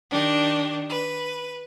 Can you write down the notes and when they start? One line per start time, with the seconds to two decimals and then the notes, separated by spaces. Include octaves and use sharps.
0.11 D#3 D4 G4
0.89 B4